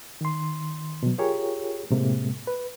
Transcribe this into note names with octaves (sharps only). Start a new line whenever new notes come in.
D#3 C6
B2 F#3
F4 G4 G#4 A#4 C#5
A2 C3 G#3 A#3
B4